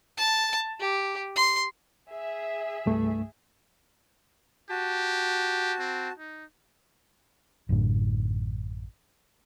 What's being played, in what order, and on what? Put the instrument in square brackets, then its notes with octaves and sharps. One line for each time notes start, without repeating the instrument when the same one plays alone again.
[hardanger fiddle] A5
G4
C6
[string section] G#4 E5
[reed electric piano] C2 G2 A3
[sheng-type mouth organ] F#4 A5 [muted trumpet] G4
[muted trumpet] C4
D#4
[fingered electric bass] A1 F#2 A2 D3